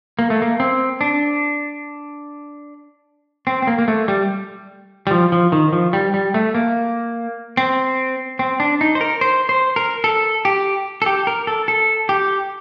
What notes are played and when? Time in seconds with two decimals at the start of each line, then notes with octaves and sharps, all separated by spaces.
0.19 A#3
0.30 A3
0.42 A#3
0.60 C4
1.01 D4
3.47 C4
3.62 C4
3.67 A#3
3.79 A#3
3.88 A3
4.08 G3
5.07 G3
5.11 F3
5.32 F3
5.52 D#3
5.73 F3
5.93 G3
6.14 G3
6.34 A3
6.55 A#3
7.57 C4
8.39 C4
8.60 D4
8.81 D#4
8.95 C5
9.01 A#4
9.21 C5
9.49 C5
9.76 A#4
10.04 A4
10.45 G4
11.02 A4
11.06 G4
11.27 A#4
11.47 A4
11.68 A4
12.09 G4